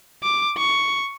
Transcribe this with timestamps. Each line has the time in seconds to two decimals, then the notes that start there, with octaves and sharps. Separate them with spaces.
0.23 D6
0.57 C#6